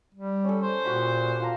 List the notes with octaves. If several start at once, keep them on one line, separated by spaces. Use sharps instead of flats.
G3
C#4 A4
C5
A#2 F#4 G4 B5
F4 A5 A#5